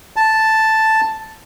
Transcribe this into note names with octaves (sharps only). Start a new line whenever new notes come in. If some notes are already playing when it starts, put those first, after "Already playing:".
A5